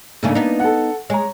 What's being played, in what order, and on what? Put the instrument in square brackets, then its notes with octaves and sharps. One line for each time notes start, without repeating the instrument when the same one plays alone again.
[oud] G#2 C#3 A3 [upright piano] A#3 D4
[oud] B3 D#4
[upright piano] A4 F#5
[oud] G#3 [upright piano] C#5 A#5